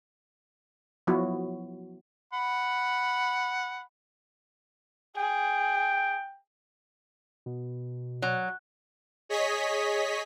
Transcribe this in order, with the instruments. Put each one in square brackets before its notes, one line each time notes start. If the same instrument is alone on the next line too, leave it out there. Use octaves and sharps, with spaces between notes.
[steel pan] F3 F#3 B3 E4 F#4
[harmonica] F#5 B5
[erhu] G#4 [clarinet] G5
[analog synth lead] B2
[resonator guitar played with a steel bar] F#3
[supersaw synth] G#4 C#5 D#5 B6